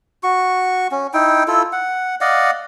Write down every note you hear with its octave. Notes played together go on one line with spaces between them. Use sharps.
F#4 C#6
C#4
D#4 E4 G5
E4 F4 A4
F#5
D5 D#5 F5 F#5